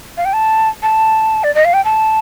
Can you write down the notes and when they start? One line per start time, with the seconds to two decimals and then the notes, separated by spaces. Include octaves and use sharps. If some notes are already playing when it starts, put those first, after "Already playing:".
0.17 F5
0.25 G5
0.33 A5
0.82 A5
1.44 D5
1.55 D#5
1.65 F5
1.74 G5
1.84 A5